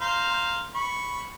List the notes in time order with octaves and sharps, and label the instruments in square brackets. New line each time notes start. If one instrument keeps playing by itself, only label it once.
[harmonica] C5 F5 A#5
B5 C#6